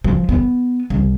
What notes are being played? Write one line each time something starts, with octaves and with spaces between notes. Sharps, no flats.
F3
B3
C2